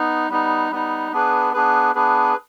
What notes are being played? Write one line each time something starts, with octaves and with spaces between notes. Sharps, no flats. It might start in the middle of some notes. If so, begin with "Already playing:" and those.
Already playing: B3 D#4
G3 B3 D#4
G3 B3 D#4
B3 D4 G#4 B4
B3 D4 G#4 B4
B3 D4 G#4 B4